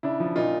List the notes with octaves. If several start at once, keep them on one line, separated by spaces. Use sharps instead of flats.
C#3 D4 E4
F3
A#2 D#4 F4